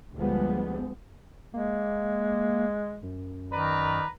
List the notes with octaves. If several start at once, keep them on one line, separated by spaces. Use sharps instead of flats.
D2 F3 G3 G#3 B3
G#3 A#3
F#2
D#3 B4 D5 A#5